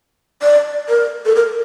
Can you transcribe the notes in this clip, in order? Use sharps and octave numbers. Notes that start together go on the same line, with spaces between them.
D5
A#4
A4
A#4